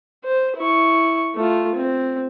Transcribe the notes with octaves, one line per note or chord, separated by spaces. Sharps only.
C5
E4 C#6
A3 F4
C4